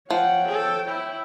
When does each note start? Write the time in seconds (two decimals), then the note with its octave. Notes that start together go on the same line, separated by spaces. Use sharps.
0.11 F3 C#5 F#5 G5
0.48 A4
0.89 E4